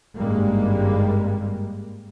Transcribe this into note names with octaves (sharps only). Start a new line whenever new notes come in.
G#1 G2 G3 G#3 A#3